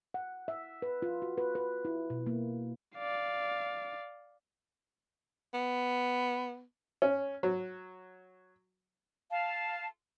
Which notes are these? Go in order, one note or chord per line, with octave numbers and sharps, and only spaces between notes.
F#5
E5
B4
F4
F#4
B4
B4
E4
B2
A#3
D5 F5
B3
C#4
F#3
F5 A5